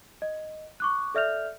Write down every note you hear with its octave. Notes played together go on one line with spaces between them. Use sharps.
D#5
C#6 D6 F#6
A4 D5 E5 F6 G6 F7